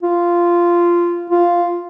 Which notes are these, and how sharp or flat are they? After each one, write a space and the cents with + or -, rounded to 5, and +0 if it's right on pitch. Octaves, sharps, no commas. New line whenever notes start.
F4 -10
F4 +0